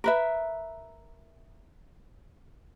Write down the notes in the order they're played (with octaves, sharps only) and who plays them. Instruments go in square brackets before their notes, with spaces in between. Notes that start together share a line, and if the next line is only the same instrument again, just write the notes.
[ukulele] A#4 B4 E5